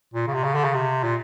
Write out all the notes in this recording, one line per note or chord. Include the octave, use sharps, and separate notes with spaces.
A#2
C#3
C3
C#3
D3
C#3
C3
A#2